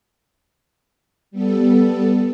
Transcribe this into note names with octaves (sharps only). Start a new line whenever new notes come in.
G3 B3 A4